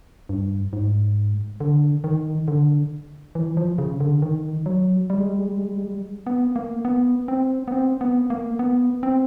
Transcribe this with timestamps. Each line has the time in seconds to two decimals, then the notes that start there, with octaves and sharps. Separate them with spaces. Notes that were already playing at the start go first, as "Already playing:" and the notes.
0.29 G2
0.73 G#2
1.60 D3
2.04 D#3
2.48 D3
3.35 E3
3.57 F3
3.78 C#3
4.00 D3
4.22 D#3
4.66 F#3
5.10 G3
5.19 G#3
5.29 G3
5.39 G#3
5.48 G3
5.58 G#3
5.68 G3
5.77 G#3
5.87 G3
6.27 B3
6.56 A#3
6.85 B3
7.28 C4
7.68 B3
7.72 C4
8.01 B3
8.30 A#3
8.59 B3
9.03 C4